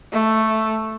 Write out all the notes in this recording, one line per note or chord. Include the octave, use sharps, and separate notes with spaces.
A3